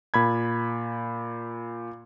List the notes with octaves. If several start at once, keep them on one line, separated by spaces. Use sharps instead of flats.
A#2 B5 G#6